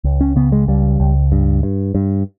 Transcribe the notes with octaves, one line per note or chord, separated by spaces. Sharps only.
C#2
C#4
C#3 B3
G#3
C#2 G3
C#2
G2
G2
G2